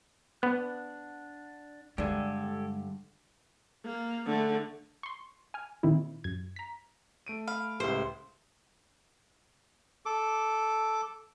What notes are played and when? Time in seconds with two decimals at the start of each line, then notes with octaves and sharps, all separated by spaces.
0.43 B3 D4 F#5 F#6
1.98 G2 D3 G3 G#3 G4 A4 G#5
3.85 A#3
4.26 D3 A3
5.03 C6 C#6
5.54 G#5 F6
5.83 A#2 D#3 C4 E4
6.24 F#2 G#6
6.56 A#5 B6
7.27 A3 D7 D#7
7.47 F5 B5
7.80 C#2 A2 G4 B4 C5 E5
10.06 A4 D6